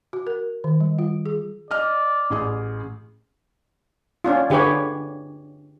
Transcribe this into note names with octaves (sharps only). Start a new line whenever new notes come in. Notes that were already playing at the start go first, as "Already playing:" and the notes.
F#4
A#4
D#3
G3
F4
G#4
D5 D#5 F6
A1 G#4 D#6
C#4 D4 F4
D3 G4 G#4 B4 C#5